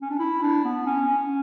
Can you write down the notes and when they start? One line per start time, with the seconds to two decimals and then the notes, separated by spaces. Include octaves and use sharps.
0.02 C#4
0.11 D4
0.20 E4
0.43 D4
0.65 B3
0.87 C#4
1.08 C#4